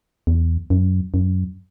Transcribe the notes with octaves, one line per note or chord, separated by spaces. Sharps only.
E2
F#2
F#2